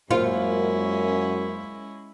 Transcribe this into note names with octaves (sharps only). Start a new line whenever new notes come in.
F#2 G#3 A#3 C#4 E4 F4 C5 F5